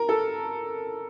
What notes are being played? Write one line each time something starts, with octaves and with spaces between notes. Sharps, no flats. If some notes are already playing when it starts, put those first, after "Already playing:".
Already playing: A#4
A4